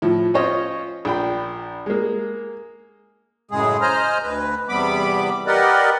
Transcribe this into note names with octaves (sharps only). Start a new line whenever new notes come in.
A2 F3
C#4 F4 C5 C#5 D#5
A#1 G5 B5
G#3 A#3
F#2 A2 C#3 G#3 G#4
C5 D#5 G#5 A#5 F6
D2 B4
E2 C3 G3 B3 B5 D6
G4 A#4 B4 D5 D#5 F#5